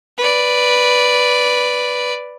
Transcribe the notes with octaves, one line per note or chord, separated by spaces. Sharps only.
B4 D5